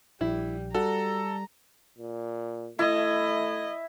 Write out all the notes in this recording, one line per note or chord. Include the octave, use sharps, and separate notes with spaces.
A#1 G3 E4
G3 F#4 A4 A#5
A#2
A3 E4 D#5